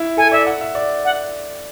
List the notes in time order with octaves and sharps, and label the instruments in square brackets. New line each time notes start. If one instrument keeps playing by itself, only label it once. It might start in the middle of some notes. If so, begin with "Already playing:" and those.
Already playing: [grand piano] E4
[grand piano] A4 [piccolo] G#5
[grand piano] D5 [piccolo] E5
[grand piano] F#5
E5
D5
[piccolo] F#5